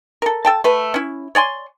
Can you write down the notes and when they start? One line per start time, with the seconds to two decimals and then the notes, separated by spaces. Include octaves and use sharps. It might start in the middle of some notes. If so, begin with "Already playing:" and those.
0.22 A4 A#4
0.45 A4 G5 A5
0.64 A3 B4
0.94 C#4 E4
1.35 C#5 D5 G#5 C6